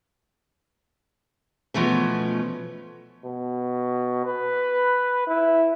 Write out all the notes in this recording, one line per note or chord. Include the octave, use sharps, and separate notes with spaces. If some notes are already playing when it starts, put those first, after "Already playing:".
B2 F3 A3 C#4
B2
B4
E4